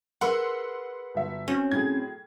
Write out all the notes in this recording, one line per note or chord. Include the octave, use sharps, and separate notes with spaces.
G#4 A#4 B4 F#5 C6 E6
G1 F#3 E5
C4 C#4 F#4
A2 F#3 G#4 G#6